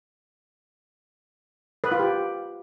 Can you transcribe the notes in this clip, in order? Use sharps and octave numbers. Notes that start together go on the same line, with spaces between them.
B4
F4
G4